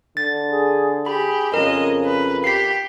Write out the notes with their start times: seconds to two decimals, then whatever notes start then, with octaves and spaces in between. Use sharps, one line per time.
0.17 D3 A6
0.51 G#4
1.06 G4 G#4 B5
1.54 F2 C#3 G#3 A#4 D#5
2.05 B4
2.44 G4 B6 C7